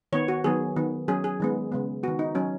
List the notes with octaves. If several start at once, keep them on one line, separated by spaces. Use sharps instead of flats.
D#3 B3 C#5
F#4
D#3 F#3 B3 G#4
D#3 B3
F#3 C#4 G#4
G#4
D#3 G#3 B3
C#3 G#3 B3
D#3 B3 F#4
D#4
F#3 C#4